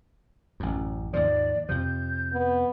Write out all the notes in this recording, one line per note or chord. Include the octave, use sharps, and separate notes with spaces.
A1 F#2
D#2 G#2 F3 D5
F2 C3 F3 G6
B3